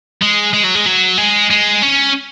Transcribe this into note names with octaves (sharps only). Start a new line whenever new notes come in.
G#3
G#3
F#3
G#3
F#3
G#3
G#3
C#4